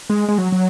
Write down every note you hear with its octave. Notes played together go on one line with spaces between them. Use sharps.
G#3
G#3
F#3
F#3